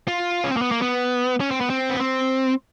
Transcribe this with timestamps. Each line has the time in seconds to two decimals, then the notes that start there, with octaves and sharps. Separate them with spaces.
0.08 F4
0.44 C#4
0.51 C4
0.57 A#3
0.62 B3
0.72 A#3
0.82 B3
1.40 C#4
1.51 C4
1.61 B3
1.70 C4
1.90 B3
2.00 C4